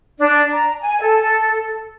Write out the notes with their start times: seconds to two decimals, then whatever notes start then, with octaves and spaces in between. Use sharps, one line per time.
0.19 D4
0.52 A#5
0.81 G#5
1.02 A4